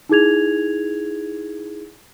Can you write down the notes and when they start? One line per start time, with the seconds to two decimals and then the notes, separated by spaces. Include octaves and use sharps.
0.09 D#4 E4 G#4 G#6 F7